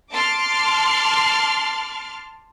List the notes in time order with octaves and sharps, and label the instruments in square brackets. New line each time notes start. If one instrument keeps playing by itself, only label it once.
[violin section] A5 C6 D6 F6